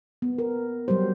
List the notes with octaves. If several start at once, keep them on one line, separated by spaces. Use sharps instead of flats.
B3
A#4
F#3 G3 G4 C5